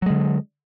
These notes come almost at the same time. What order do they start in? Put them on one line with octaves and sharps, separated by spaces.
F#3 G#3 D3